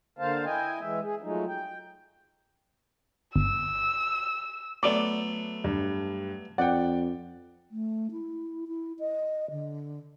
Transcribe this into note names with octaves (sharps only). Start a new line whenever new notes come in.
D3 A#3 C5 F5 A5
E4 D#5 G5 G#5
E3 G#3 E5
G#4
F3 F#3 G#3 A3 D#4
G5
G1 E6
F#3 A3 B3 D5 D6
G2
F2 D5 F#5 G5
A3
E4
E4
D#5
D3